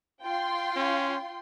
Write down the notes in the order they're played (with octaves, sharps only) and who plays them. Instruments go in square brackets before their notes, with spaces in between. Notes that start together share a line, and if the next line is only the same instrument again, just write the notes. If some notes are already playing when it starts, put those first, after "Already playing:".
[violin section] F4 G5 C6
[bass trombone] C#4